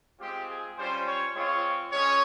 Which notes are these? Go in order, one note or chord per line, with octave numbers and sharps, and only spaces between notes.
G#3 C4 F4 G4
G#4
G3 C#4 F4 C5
C#5
G#3 C4 F4 C#5
G#3 C#4 C#5